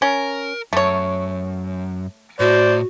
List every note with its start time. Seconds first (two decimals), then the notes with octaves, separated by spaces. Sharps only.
0.02 C#4 A#4
0.73 F#2 A3 C#5
2.40 A2 F#4 C5 D5